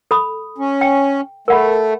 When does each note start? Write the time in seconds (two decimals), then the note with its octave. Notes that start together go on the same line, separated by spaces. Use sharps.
0.11 A4 B5 D#6
0.58 C#4
0.81 G5
1.48 A3 A#4 F#5 B5